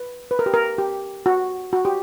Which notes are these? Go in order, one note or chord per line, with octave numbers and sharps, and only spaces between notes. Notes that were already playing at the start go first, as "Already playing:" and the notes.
Already playing: B4
B4
A#4
G4
A#4
G4
F#4
F#4
G4